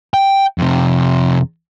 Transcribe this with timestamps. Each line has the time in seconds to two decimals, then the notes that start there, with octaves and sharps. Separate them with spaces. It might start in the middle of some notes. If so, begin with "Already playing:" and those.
0.14 G5
0.58 F2 C3